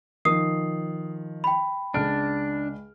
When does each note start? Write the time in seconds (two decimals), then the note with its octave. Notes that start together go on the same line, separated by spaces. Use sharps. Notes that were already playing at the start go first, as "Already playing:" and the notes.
0.25 D#3 F3 D#6 C7
1.44 G5 B5
1.94 C#2 D4 F6 D7